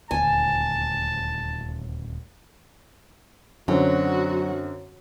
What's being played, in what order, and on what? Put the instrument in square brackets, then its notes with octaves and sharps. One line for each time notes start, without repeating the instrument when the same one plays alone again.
[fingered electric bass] D#1 D2 [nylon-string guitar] G#5 [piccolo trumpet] A5
[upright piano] F#2 D3 C4 [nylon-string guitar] F#3 [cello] F#4